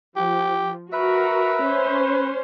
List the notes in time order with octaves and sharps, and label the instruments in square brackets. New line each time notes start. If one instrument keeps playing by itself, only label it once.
[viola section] F3 [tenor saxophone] G4
[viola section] F#4 A#4 [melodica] B4 [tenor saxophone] E5
[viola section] C#4 C5